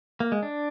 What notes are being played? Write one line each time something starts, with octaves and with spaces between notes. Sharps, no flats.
A#3
G#3
D4